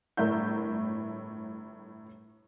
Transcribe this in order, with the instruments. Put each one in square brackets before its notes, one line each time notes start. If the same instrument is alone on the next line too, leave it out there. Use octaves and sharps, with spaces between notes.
[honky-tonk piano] G1 A2 A#4 E5 G6